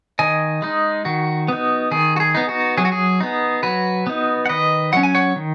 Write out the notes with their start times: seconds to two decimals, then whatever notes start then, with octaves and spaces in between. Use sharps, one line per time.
0.19 D#3 D#5 G#5
0.62 G#3 D#4
1.05 D#3 F#4
1.48 B3 D#4
1.91 D#3 G#4
2.16 F#4
2.20 G#4
2.35 B3 D#4
2.49 F#4
2.78 F#3 G#4
2.85 F#4
2.92 G#4
3.20 B3 D#4
3.63 F#3 F#4 B4
4.07 B3 D#4
4.46 F#5
4.49 D#3 B4 D#5
4.93 F#3 C#4 F#5
5.03 G#5
5.15 C#5 F#5
5.36 D#3